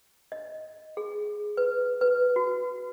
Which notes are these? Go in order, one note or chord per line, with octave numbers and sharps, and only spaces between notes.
D#5
G#4
B4
B4
F#4